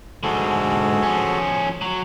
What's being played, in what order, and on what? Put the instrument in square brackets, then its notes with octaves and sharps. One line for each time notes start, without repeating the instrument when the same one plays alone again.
[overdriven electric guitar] G#2 D3 [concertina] F#4 G#4 A4
[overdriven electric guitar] F3 C#4
F#3